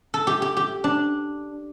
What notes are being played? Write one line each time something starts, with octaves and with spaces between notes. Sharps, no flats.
A4
G4
G4
G4
D4